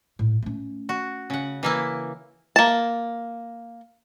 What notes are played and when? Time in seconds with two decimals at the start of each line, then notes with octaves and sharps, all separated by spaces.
0.19 A2
0.42 A3 C#4
0.89 F#4
1.30 C#3 F#5
1.63 E3 A#3 E4
2.56 A#3 A5